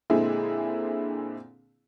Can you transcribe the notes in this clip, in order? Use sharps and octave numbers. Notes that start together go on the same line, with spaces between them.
A#2 D3 G#3 C4 E4 G#4